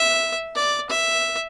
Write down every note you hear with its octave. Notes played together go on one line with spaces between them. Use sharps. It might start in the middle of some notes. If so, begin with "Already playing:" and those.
Already playing: E5
D5
E5